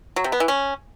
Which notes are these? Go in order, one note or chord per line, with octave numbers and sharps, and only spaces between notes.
F#3
C3
B3
E3
C#4